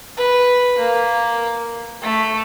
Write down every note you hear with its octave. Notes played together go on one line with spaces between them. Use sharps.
B4
A#3
A3